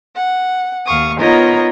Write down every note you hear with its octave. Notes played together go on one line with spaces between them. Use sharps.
F#5
D#2 F5 C#6 D#6
B3 D#4 F4 A#4 C#5 D#5